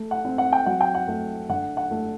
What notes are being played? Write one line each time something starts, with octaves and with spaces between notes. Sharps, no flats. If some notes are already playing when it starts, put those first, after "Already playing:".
Already playing: A3
F#5
C4
F#5
G5
F#3 F#5
G5
F#5
A3
D3 F#5
F#5
A3